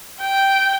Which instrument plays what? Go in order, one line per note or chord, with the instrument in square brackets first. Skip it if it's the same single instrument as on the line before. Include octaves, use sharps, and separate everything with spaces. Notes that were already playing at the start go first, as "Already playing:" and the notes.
[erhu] G5